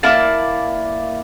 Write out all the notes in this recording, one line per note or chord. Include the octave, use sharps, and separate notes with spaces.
A#3 E4 D5 A5